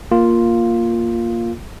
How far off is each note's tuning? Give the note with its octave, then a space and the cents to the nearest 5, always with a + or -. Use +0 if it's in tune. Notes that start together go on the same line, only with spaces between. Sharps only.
A#3 +0 F4 +0